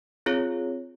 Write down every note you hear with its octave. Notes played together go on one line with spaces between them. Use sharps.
C4 F4 G#4 C#5